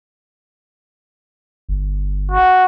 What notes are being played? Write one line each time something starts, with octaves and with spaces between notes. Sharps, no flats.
G1
F#4